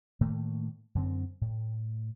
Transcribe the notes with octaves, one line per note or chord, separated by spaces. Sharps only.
A2 D#3 A3 A#3
F#2 D3 C4
A2